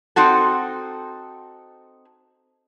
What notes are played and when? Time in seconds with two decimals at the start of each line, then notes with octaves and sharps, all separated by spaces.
0.16 C4 D#4 F#4 A4